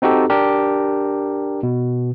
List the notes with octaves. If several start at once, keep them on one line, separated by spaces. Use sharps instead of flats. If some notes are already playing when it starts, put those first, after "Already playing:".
C4 D#4 F#4 G4 A4
D4 G4 A#4
B2